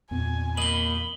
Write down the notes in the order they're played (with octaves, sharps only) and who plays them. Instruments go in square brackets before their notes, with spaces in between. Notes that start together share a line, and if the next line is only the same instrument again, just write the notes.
[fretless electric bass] E2 A#2 C4 [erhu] G#5
[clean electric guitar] A#3 D#5 [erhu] B5 [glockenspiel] F#7 G7